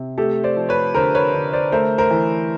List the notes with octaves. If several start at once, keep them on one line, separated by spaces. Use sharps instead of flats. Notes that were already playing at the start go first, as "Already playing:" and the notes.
Already playing: C3
A3 G4 A4
C5 D5
F3
B4 C#5
D3 A#4 C5
B4 C#5
D3
C5 D5
A3 A#4 C5
A#4 C5
E3